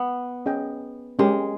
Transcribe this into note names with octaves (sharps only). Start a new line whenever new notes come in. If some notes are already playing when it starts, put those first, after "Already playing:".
Already playing: B3
C#4 G#4 D#5 G5
G#3 C#4 G4 A#4